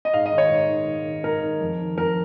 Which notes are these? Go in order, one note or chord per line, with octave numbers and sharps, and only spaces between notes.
D#5
G#2 F5
D#5
D#3
C#5
G#2
D#3
G#2
D#3
G#2 A#4
D#3
F2
D#3
F2 A#4